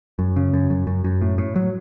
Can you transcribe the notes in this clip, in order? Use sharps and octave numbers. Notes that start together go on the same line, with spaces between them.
F#2
C#3
F#2
F#2
F#2
F#2
A2
A2
F#3